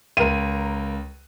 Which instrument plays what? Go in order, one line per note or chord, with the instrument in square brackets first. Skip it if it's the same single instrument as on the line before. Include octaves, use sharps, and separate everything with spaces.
[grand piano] C#2 [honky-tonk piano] A#4 D#7